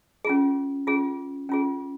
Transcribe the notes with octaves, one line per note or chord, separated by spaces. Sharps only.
C#4 F4 G#4
C#4 F4 G#4
C#4 F4 G#4